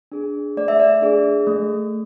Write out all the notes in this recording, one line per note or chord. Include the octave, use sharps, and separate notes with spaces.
D4 G#4
A3 D5
E5
D5
D4 G#4
A3